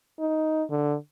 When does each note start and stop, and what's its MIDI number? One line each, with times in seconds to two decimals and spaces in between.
0.19 0.63 63
0.70 0.96 50